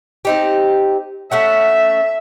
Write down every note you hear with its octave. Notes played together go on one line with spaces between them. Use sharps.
C4 D#4 G4
A3 C#4 E5 F#5